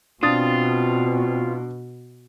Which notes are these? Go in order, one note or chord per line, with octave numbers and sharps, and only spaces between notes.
B2 C4 D4 F4 D#6 A6